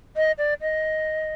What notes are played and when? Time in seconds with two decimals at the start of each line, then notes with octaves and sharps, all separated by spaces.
0.16 D#5
0.38 D5
0.61 D#5